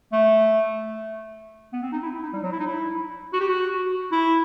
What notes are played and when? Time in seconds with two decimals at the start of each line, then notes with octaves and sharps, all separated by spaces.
0.13 A3
1.73 B3
1.83 C4
1.92 D#4
2.03 E4
2.13 E4
2.23 D#4
2.33 G3
2.43 F#3
2.52 E4
2.59 D#4
2.66 E4
3.33 F#4
3.40 G4
3.48 F#4
4.12 E4